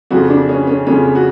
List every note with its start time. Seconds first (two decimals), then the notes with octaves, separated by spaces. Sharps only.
0.11 F2 C#3 F3 F#4
0.30 D4
0.49 C#4
0.67 C#4
0.87 F2 C#3 F3 C#4
1.15 F#4